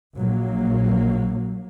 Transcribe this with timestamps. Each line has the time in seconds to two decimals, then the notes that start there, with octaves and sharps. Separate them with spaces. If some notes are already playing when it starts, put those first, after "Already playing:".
0.16 A#1 F#3 A#3